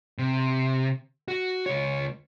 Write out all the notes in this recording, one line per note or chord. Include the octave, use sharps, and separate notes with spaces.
C3
F#4
C#2 C#5